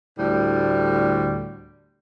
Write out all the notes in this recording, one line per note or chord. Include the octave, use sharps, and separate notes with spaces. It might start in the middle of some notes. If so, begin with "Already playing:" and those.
D2 A2 G3